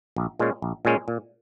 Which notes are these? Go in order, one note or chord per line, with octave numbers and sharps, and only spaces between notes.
A#1
A#2 G#3 C#4
A#1
A#2 G#3 C#4
A#2